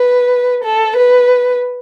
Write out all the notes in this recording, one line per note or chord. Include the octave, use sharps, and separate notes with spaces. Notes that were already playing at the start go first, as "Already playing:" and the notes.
Already playing: B4
A4
B4